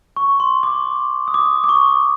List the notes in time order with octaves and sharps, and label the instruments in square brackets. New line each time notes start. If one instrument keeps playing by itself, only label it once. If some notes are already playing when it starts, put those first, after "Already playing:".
[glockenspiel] C#6
C6
D6
D#6
D6
D6
C#6